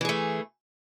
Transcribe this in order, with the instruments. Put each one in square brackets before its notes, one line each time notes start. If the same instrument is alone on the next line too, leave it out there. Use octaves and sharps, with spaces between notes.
[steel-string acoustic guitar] E3
G#4
A3